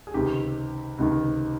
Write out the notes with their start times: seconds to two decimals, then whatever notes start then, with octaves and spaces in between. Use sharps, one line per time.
0.07 G#4
0.14 C#2 C3 D#3 G4
0.98 C#2 C3 D#3